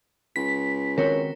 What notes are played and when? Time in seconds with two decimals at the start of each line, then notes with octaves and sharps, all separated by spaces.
0.36 C#2 B6
0.98 D#3 C4 F#4 A#4 C#5